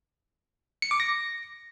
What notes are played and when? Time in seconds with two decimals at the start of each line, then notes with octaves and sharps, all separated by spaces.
0.82 C#7
0.91 D6
1.00 A#6